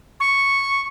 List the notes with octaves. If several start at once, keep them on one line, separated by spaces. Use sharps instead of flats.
C#6